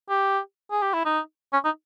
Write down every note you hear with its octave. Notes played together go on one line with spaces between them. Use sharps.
G4
G#4
G4
E4
D#4
C#4
D#4